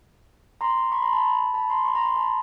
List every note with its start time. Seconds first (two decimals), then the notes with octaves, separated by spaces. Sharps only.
0.61 A#5 C6
0.92 B5 C#6
1.02 A#5 C6
1.13 A5 B5
1.54 A5 B5
1.70 A#5 C6
1.85 B5 C#6
1.95 A#5 C6
2.06 A#5 C6
2.16 A5 B5